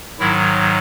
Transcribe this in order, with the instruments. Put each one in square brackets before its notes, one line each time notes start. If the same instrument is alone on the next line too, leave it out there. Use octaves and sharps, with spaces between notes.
[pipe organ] G#2 D#3 F#3 E4